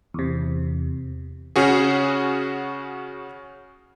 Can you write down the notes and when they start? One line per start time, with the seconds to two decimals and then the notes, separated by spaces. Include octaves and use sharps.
0.14 E2 C3
1.56 C#3 C#4 F#4 G#4